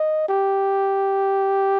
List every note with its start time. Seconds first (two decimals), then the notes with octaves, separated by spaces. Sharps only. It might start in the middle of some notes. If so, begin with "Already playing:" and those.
Already playing: D#5
0.29 G4